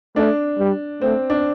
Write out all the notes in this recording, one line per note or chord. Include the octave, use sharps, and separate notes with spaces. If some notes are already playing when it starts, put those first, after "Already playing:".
A3 D4
G3
A3 C4
D4